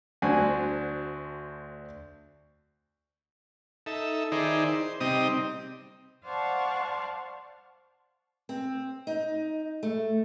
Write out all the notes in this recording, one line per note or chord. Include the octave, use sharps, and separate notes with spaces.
D2 C4 D4 F#4 G#5
D#4 A4 E5
D#3 D#4 E4 G#4 C5 D5
C5
C3 G3 C4 D#4 D#5 D#6
C5 D5 F5 F#5 A5 C#6
C4
D#4
A3